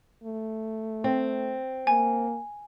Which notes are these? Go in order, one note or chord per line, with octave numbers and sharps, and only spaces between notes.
A3
C4
A#3 G#5